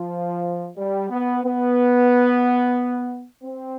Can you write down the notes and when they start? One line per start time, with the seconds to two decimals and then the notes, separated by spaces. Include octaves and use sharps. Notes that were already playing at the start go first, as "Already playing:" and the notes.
Already playing: F3
0.77 G3
1.10 B3
1.44 B3
3.44 C4